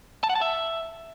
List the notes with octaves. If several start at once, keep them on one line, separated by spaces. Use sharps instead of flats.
A5
F#5
A5
E5